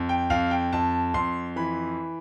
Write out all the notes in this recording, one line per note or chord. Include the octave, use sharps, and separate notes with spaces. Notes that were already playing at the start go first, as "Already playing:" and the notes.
Already playing: F2
G5
F2 F5
G5
F2 A5
F2 C6
E3 B5